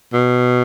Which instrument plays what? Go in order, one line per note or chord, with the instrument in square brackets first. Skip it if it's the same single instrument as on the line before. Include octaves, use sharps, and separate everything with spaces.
[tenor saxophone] B2